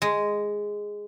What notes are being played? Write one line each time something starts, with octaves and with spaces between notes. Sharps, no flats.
G#3